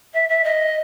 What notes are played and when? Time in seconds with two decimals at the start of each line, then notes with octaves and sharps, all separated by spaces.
0.14 E5
0.29 E5
0.44 D#5